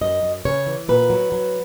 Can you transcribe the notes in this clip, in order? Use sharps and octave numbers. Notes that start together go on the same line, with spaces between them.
F#2 D#5
F#2
C#3 C#5
E3
A#2 B4
F#3
F#3